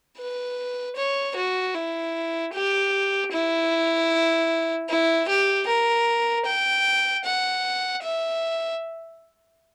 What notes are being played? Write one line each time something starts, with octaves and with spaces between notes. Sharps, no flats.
B4
C#5
F#4
E4
G4
E4
E4
G4
A#4
G5
F#5
E5